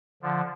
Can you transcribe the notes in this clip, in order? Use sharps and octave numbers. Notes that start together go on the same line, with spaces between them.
D3 F3